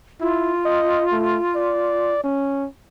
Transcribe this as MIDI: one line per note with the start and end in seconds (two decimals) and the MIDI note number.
0.21 0.52 64
0.21 2.13 65
0.65 1.04 75
1.12 1.38 57
1.55 2.23 74
2.24 2.67 61